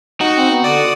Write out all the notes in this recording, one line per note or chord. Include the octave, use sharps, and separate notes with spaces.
D#4 F#4
C4
B3
D3 D5 D#6